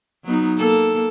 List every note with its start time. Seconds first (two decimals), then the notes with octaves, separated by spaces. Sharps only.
0.25 F#3 B3 D#4
0.58 A#3 A4